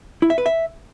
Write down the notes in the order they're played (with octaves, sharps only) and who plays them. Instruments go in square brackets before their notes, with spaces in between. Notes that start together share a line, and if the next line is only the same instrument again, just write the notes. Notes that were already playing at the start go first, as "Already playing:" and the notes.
[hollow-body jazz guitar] E4
E5
B4
E5